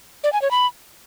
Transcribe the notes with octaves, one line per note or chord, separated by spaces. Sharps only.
D5
G#5
C#5
B5